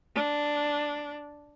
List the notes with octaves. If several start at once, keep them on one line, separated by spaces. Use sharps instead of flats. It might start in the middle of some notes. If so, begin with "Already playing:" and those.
D4